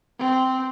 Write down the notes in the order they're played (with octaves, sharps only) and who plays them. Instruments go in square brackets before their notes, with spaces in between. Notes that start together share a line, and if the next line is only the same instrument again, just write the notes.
[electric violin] C4